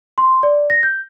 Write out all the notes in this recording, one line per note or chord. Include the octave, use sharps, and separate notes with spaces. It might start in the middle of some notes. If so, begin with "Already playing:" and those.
C6
D5
A#6
G6